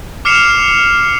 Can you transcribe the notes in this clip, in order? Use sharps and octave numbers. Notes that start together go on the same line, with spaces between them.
D6 F6 C7 C#7 E7 F7